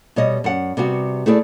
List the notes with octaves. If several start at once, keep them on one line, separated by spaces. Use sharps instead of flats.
B2 G3 C#5 D#5
F#2 F#5
C3 G3 B3 F#4
A3 E4 G#4 C5 D5